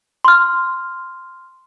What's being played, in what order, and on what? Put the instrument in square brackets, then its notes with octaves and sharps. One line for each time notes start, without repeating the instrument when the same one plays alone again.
[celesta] C6 F6